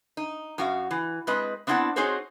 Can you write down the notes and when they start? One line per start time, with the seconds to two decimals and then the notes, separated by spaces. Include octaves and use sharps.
0.17 D#4
0.58 F#2 F#4 F5
0.91 E3
1.27 G#3 C4 B4 D#5
1.67 B3 C4 D4 E4 F#5 A5
1.96 C4 D#4 F#4 G#4 C5 C#5